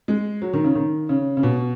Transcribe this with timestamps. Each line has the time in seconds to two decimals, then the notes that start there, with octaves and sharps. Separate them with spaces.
0.08 G#3
0.42 F#3
0.53 D#3
0.64 C#3
0.75 D#3
1.09 C#3
1.37 C#3
1.43 B2